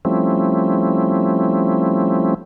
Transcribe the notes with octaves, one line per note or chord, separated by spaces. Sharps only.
F3 G3 A3 C4 C#4 E4